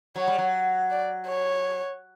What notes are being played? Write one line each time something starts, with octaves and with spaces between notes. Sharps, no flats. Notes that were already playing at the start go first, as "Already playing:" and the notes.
F#3 C#5
G3
F#3
D5
C#5